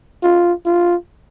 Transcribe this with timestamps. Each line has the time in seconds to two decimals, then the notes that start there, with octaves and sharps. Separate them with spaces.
0.23 F4
0.65 F4